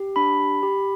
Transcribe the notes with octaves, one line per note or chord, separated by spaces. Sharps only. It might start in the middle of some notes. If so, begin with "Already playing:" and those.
Already playing: G4
D4 B5
G4
G4